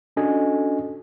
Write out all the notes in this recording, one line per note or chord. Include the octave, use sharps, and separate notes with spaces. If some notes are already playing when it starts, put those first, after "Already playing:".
C#4 D4 F#4 A4 D#5 G#5